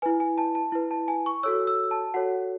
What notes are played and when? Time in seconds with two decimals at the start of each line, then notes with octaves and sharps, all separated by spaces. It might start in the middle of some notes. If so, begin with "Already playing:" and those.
0.02 E4 B4 G#5
0.20 G#5
0.38 A5
0.55 A5
0.72 E4 B4
0.91 A5
1.08 G#5
1.26 C#6
1.43 F#4 A4 C#5 E6
1.67 E6
1.91 A5
2.14 F#4 A4 C#5 F#5